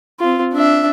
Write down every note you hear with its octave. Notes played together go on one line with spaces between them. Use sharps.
C4 F4
D4 E5